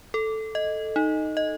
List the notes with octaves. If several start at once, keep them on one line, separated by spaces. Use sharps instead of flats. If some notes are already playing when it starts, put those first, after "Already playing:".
A4
D#5
D#4
D#5